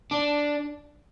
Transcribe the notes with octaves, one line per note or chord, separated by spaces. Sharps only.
D4